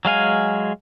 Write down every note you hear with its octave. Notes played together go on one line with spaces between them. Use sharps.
F#3 G#3 F5 G#5